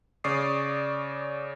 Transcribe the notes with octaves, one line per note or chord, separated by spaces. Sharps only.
C#3 D5 C#6 D#6 C7